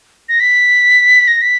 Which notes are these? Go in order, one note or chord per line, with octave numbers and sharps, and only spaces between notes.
A#6
B6
A#6
B6